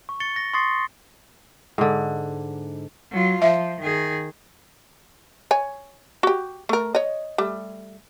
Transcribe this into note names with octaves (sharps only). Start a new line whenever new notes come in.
C#6
A6 C#7 G7
A#6
C6 C#6 D#6 A6 C7 C#7
G#2 D3
F#3 F4
F3 E5
D#3 G#4
C#5 G#5
F#4 G4
A3 A#4
C#5 D#5
G3 A3